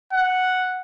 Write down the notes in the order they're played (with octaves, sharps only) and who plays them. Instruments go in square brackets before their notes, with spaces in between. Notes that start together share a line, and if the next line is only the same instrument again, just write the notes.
[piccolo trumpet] F#5